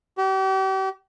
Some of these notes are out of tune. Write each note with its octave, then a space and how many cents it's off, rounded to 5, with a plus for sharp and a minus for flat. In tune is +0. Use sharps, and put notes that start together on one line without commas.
G4 -40